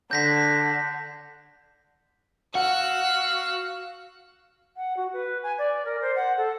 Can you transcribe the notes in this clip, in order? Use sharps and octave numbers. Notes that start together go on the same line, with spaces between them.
D3 G6 A#6 B6
F#4 F5 F#5 E6 F#6
F#5
F#4
B4
G#5
D5
A#4
C5
F#5
A4